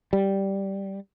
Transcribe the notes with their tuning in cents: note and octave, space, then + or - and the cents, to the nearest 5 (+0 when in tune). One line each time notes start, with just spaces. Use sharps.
G3 -5